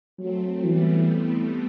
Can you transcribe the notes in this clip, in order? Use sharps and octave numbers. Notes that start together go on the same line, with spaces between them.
F#3 A3 C4
E3 G3 B3